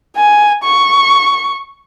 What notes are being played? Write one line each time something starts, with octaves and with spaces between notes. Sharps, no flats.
G#5
C#6